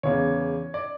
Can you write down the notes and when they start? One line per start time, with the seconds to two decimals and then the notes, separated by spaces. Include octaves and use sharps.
0.03 E2 C#3 E3 C#5
0.74 D5